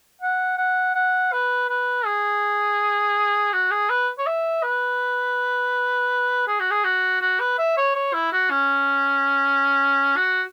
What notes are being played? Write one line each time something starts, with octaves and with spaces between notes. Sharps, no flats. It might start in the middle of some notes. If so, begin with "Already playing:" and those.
F#5
F#5
F#5
B4
B4
G#4
F#4
G#4
B4
C#5
E5
B4
G#4
F#4
G#4
F#4
F#4
B4
E5
C#5
C#5
E4
F#4
C#4
F#4